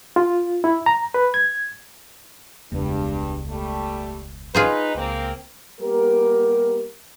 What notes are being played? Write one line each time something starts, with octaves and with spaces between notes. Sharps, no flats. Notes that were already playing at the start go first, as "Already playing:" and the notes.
F4
E4
A#5
B4
G#6
E1 C#2 G2
G3 A3
D#4 F4 G#4 B4 C5
C#2 A#3 C4
G3 A#3 B3 G4 A#4